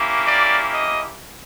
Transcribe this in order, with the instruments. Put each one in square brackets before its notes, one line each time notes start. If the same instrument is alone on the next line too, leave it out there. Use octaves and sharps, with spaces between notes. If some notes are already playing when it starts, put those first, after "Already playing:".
Already playing: [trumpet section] A#3 C#4 E4 G4
D5
D#5